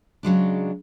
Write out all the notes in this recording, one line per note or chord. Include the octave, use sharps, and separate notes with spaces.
C#3 F#3 G#3 D4